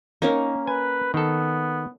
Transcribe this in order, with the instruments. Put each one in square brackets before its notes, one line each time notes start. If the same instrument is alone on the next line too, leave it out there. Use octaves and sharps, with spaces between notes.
[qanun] A#3 C#4 A#4 [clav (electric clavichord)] D#4
[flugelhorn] B4 [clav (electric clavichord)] G#5
[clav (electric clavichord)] D#3 A4 [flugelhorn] B3